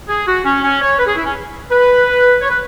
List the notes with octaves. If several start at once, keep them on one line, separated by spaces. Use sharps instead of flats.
G#4
F#4
C#4
C#4
C#5
B4
G#4
E4
C#4
B4
C#5
B4